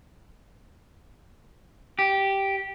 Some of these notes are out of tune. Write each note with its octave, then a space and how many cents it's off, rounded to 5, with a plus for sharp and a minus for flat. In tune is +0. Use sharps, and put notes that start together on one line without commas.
G4 -5